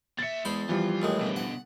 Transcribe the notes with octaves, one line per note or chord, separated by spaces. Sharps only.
D#2 E5 A6 C#7
E2 G#3 C5 B5
E3 F3 G3 F4
D#2 A2 G#3
B2 D3
F#5